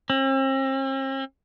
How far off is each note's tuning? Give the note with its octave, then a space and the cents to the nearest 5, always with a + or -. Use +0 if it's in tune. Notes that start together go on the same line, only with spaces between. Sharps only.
C4 +45